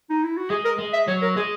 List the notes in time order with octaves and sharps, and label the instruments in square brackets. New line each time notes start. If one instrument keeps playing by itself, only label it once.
[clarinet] D#4
E4
F#4
[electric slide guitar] G#3 [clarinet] G#4
[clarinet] A#4
[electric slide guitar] G#3
[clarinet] E5
[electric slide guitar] F#3 [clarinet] C#5
[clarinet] A#4
[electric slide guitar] G#3 [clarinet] G#4